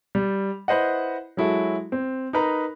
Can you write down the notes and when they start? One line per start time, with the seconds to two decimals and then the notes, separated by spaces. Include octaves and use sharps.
0.15 G3
0.68 E4 B4 C5 D#5 F#5
1.37 F#3 G#3 E4 F#4 A4
1.92 C4
2.33 D#4 A#4 B4 A#5